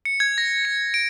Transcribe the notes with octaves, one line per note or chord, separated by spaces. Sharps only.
C#7
G#6
A#6
C#7
D7